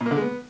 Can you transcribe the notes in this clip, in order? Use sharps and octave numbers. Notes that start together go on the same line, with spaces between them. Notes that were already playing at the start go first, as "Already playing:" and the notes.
A#2
A#3
D3
G#3
B3